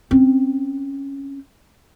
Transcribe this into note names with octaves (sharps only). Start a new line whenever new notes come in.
C4 C#4